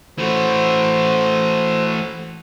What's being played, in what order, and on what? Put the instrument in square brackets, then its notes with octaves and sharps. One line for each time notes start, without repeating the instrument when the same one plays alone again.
[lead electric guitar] E3 A3 [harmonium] F#4 C5